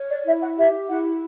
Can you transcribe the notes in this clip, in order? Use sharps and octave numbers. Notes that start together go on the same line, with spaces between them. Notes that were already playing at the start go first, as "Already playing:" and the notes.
Already playing: C#5
D5
E4 E5
F#5
G4 E5
E4 F#5